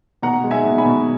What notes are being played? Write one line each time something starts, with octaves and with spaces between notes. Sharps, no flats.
B2 F#5 A#5
G#3
E5 G#5
B2
G#5 B5
B2